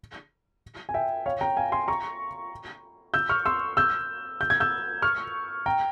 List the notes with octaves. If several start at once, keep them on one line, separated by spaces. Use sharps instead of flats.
G#5
E5 G5
C#5 F5
G5 A#5
F5 G#5
G#5 C6
A#5 C#6
E6 G6
C#6 F6
C6 E6
E6 G6
G6
G#6
E6 G6
C#6 F6
G5 A#5